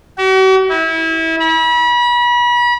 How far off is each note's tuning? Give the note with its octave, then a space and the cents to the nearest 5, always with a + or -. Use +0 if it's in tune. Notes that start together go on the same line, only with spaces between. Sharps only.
F#4 +45
E4 -25
B5 -35